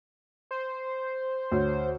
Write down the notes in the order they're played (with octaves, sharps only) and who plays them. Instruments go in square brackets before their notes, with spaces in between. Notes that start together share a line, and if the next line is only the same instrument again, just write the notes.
[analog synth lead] C5
[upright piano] D2 C#5